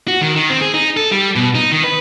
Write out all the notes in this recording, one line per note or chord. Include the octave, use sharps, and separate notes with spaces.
F#4
D#3
D#3
C4
G#4
D#4
A4
G3
B2
D#4
D#3
B4